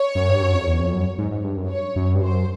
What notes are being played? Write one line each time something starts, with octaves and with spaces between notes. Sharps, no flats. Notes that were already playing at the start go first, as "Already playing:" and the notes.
Already playing: C#5
F#2
G2
F#2
F2
E2
F2
F#2
G#2
G#2
G2
F#2
C#5
F#2
G2
F#2 C5